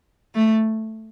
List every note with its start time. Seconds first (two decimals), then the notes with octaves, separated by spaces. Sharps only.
0.35 A3